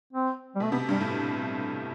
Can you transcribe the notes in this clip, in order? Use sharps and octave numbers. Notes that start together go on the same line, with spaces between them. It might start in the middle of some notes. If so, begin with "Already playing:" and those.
C4
G3
B2 A3
C3 B3
G2 G3
A2